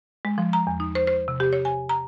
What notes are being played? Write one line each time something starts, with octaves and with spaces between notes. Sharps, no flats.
G#3
F3
A#5
E2
D#4
C5
C5
C3
G4
C#5
G#5
A#5